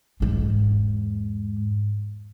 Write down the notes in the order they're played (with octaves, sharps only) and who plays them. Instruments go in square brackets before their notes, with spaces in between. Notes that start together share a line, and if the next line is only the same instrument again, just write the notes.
[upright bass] E2 G#2